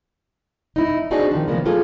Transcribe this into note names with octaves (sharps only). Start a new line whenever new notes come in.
D#4 E4
C4 D4 D#4 F#4 G#4
D#3 F3
C#3 F3 A#3 B3
F#3 F4 G#4 A4